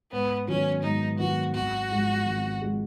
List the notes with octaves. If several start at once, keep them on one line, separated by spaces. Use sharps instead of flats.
G#2 B3
D#3 F#3 B3 C#4
G#2 D#4
D#3 F#3 B3 F#4
G#1 F#4
G#2 F3 G#3
G#1
F3 G#3